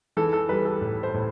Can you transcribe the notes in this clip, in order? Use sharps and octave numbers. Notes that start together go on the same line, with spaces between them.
E3 A4
A4
G3 B4
A4
A2
C5
A2